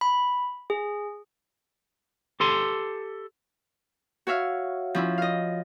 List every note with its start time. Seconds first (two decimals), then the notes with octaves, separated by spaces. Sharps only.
0.01 B5
0.70 G#4
2.40 G4 A4 C6
4.27 F#4 C#5 E5 F5
4.95 F3 C#4 E4
5.18 D#5 F5